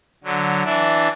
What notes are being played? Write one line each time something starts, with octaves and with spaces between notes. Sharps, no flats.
D3 F#3
E3 D4 E4